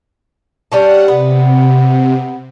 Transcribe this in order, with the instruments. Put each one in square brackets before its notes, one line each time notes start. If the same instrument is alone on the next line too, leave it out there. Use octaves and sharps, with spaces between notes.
[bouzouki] G3 C#4 D4 [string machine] F#5
[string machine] C3 [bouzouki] B3